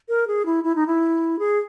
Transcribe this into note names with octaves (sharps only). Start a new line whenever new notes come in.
A#4
G#4
E4
E4
D#4
E4
G#4